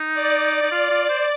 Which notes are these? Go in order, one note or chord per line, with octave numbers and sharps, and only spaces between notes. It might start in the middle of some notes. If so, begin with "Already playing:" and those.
Already playing: D#4
D5
D#4
F4
F4
C5